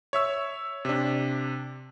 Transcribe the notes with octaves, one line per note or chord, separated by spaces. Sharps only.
C#5 E5 E6
C3 D4